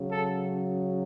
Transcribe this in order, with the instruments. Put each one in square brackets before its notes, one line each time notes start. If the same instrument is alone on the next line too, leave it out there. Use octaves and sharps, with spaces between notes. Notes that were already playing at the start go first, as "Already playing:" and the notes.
Already playing: [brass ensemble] C#3 F#3
A4